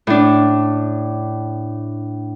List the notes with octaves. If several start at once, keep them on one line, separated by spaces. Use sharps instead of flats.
A2 D4